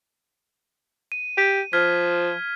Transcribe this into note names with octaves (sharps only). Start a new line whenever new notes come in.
D#7
G4
F3 F6 G#6 B6